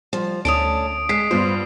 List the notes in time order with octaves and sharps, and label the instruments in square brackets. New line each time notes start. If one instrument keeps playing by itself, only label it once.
[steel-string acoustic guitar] F3 [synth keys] G3
[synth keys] D2 [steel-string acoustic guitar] A3 C#4 D4 [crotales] D#6 D7
[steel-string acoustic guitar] G#3 [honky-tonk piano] B6 [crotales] C7
[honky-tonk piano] G2 B3 [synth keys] F4 [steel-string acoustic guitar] C5